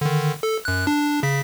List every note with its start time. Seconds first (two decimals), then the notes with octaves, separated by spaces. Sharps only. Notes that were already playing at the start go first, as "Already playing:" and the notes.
0.01 D3 D#3
0.43 A4
0.65 F#2 F#6
0.87 D4
1.23 C#3 B6